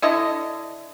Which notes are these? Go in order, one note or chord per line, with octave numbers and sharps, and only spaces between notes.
D3 E4 D#5